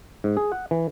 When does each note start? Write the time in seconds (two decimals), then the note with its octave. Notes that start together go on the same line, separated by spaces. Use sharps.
0.24 G#2
0.37 G#4
0.52 F#5
0.71 E3